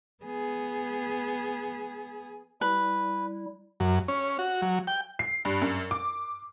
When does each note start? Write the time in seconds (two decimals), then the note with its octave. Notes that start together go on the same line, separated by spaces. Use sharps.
0.24 B3 G#4
2.61 G3 E4 B4
3.80 F#2
4.08 C#4
4.39 F#4
4.62 F#3
4.87 G5
5.19 C7
5.45 G2
5.62 F#2
5.91 D6